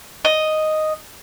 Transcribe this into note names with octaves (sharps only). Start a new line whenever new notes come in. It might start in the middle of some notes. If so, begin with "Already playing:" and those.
D#5